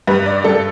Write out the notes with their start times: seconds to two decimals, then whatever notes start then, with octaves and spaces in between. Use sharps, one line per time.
0.07 G2 B4
0.26 D5
0.44 G2 A4